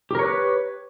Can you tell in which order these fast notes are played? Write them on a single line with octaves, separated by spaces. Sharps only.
G4 A#4 C#5 B4